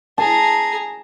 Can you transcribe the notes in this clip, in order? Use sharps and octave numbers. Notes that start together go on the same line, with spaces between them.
G#4 A5 A#5